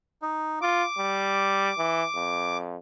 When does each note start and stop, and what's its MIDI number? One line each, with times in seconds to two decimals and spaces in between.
0.22 0.59 63
0.62 0.84 65
0.62 2.57 86
0.98 1.70 55
1.78 2.03 52
2.15 2.76 41